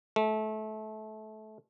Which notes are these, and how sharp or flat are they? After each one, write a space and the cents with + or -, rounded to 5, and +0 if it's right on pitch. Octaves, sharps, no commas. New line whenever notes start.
A3 -25